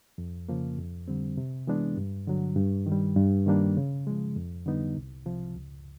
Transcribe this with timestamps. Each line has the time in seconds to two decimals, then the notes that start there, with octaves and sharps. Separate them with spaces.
0.18 F2
0.49 C#3 F3 A#3
0.78 F2
1.08 D3 G3 C4
1.37 C3
1.67 E3 G#3 B3 D4
1.97 G2
2.27 D3 F#3
2.56 G2
2.86 D#3
2.92 G3
3.17 G2
3.46 D#3 G3 A#3 D4
3.77 C#3
4.07 F3 G#3
4.36 F2
4.66 D3 G3 B3 D#4
4.96 C2
5.26 C3 F3
5.56 C#2